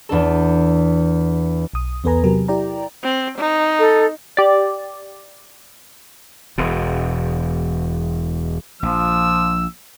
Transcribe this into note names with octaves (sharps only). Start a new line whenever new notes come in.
E2 D4 A4
B1 D#6
E2 B3 A4 B4 G#5 A#5
C3 F#3 G4 A#4
E4 G4 D5 G5 A#5
C4
D#4
A4
G4 D5
E1 E2 B2
A#1 F3 E6